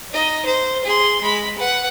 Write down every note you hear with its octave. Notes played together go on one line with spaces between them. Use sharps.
D#4 D#5
C5
G#4 C6
G#3 B5
B4 F#5